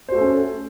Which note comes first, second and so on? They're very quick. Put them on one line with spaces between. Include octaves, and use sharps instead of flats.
C5 F#4 A3 A4 C#4